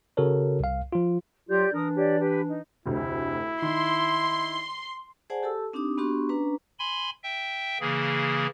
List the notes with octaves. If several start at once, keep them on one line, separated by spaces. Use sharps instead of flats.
C#3 F#4 A4 A#4 C#5
C2 F5
F3 F4
F#3 F4 G4 D5 G6
E3 D4 A#4 D#6
G4 C#5 D5
G4 B4
D#4
F1 D2 E4
D#3 C6
G#4 C5 D5 F#5 G#5 A5
G4 A4 A5 E6
C4 D4 D#4 G4 D6 D#6
B3 D4 F#4 G4 C6 C#6
C#4 D4 B4 A#5
G#5 B5 C6
E5 G5
C#3 E3 A#3 G#4